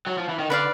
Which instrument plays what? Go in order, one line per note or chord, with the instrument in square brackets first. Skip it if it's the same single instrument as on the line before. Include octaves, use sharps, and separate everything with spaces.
[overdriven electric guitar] F#3
F3
E3
D#3
[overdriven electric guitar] D3 [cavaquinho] B4 D5 F5